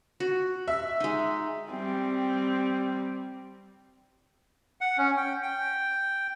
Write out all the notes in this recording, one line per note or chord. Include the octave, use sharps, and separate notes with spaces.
F#4
E5
G#3 D#4
G3 C4
F#5
C#4
G5
G5